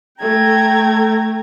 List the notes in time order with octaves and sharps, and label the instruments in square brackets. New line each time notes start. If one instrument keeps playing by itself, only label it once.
[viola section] A3 [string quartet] G5 A#5 G#6